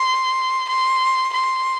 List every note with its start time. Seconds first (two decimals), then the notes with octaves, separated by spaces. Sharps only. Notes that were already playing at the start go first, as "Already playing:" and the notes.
Already playing: C6
0.69 C6
1.33 C6